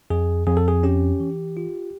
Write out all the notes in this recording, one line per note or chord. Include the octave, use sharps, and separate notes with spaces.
F2 G#4
F2 G#4
A4
G#4
C#4 G4
E3
F4